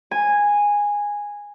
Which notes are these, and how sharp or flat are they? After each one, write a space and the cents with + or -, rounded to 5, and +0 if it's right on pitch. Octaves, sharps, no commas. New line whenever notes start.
G#5 -10